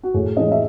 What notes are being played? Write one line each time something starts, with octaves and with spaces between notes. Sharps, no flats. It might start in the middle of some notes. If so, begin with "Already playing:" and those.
F#4
A2 G#4
E3 G#3 C#4 D#5
E5